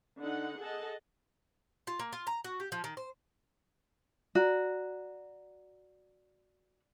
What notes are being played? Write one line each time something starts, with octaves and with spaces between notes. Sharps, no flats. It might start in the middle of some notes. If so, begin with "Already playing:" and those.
D3 D#4 F#5
G#4 A4 D#5 F#5 A5
F4
A#3
F4
A#5
F#4
G4
F3
D#3
C5
F#4 D5 A#5